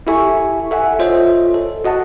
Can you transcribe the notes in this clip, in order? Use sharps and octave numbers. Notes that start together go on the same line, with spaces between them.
E4 G4 A4 E5 G#5 C#6
A4 E5 F#5 G#5
F4 A4 C5 C#5 D#5 E5
A4
F#4 D#5 F#5 A5